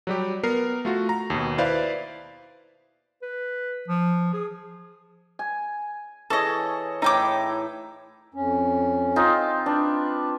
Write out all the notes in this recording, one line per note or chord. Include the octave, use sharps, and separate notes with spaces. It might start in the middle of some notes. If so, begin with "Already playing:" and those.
F#3 G3 G4
B3 A#4 C7
A3 F4 F#4
A#5
D#2 B2
E4 B4 C5 D5 F5
B4
F3
G#4
G#5
E3 G#4 A4 C#5 D#5
A2 D#4 E4 G5 A#5 D6
F2 C#4
C4 D#4 F4
D4 B4